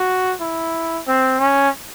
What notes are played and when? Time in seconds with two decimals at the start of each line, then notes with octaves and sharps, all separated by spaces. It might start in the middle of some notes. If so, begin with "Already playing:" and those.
Already playing: F#4
0.41 E4
1.07 C4
1.39 C#4